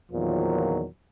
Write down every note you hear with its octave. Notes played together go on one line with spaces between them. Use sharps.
E2 A#2 D#3 F3 F#3